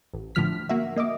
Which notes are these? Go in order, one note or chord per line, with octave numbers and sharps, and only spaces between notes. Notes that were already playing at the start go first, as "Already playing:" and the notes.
A1
A2 D3 F3 F6 B6
A#3 F#4 E5
A#3 D#5 E5 D6